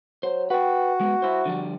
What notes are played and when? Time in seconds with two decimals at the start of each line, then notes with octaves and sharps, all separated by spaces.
0.23 F#3 C5
0.50 F#4 B4 G5
1.01 G#3 B3
1.22 E4 C5
1.46 D3 F3 G3